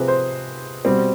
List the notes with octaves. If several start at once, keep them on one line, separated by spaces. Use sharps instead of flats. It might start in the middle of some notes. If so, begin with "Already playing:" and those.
Already playing: C3 F3 C4 G#4 B4
C5
B2 G3 C4